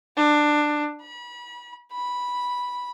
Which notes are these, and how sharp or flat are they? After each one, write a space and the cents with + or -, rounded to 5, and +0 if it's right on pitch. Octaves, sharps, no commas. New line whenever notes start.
D4 +15
B5 -35
B5 -10